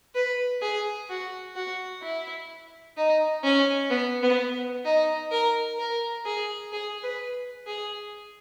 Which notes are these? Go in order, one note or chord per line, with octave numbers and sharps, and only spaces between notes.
B4
G#4
F#4
F#4
E4
D#4
C#4
B3
B3
D#4
A#4
A#4
G#4
G#4
B4
G#4